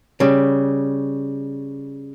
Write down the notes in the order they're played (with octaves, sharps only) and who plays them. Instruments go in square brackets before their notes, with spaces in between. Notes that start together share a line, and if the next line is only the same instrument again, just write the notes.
[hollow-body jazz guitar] C#3 G3